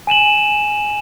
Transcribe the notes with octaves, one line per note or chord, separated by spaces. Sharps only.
G#5 D#7 E7 F#7